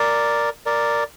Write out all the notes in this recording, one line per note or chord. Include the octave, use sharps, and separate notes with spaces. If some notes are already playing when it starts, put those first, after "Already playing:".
Already playing: A#4 D5
A#4 D5